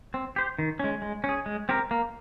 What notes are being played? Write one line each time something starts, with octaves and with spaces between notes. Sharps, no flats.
C4
G4 C5
D#3
G#3 C#4
G#3
C#4
G#4
G#3
C4 G4 A#4
A#3